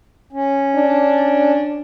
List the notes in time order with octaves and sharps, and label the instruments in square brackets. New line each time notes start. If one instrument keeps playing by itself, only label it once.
[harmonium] C#4
[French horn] D4